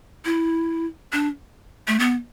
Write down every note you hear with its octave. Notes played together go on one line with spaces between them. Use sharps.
E4
D4
A3
B3